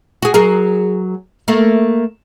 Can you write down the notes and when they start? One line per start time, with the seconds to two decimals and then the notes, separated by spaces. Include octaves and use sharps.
0.22 F#4 G#4
0.34 F#3 G#4 A#4
1.48 A3 A#3